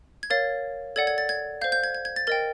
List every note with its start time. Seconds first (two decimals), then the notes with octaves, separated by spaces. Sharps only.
0.23 G#6
0.30 A#4 C#5 F5 A6
0.96 A4 D5 F#5 G#6
1.07 G#6
1.18 A6
1.29 G#6
1.61 F5 G6
1.64 C5
1.72 G6
1.84 G#6
1.95 G#6
2.05 G#6
2.16 A6
2.27 A#4 D#5 G5 A6